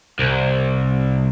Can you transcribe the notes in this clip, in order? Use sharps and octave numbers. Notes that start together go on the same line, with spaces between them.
C2